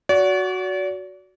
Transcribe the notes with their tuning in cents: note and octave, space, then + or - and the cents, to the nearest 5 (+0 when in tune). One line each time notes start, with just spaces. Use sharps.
F#4 +0 D5 -40